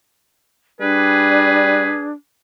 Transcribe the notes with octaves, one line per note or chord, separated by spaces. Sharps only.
G3 D4 G#4 B4